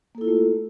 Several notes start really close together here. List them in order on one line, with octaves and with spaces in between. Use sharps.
A#3 A4 E4 F4 A3